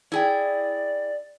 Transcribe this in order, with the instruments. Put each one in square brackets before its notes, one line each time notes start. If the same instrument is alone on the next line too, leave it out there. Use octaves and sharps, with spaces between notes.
[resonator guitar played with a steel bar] E4 G#4 G5 [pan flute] D5